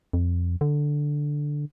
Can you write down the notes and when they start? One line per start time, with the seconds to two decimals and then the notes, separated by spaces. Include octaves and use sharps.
0.13 F2
0.61 D3